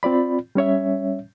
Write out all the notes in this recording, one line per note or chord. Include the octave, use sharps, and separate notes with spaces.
C4 F4 D5 B5
G3 C#4 C#5 E5